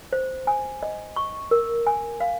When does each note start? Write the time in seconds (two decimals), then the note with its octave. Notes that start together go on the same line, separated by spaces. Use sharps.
0.13 C5
0.47 G#5
0.83 D#5
1.16 C#6
1.51 A#4
1.87 G#5
2.20 F5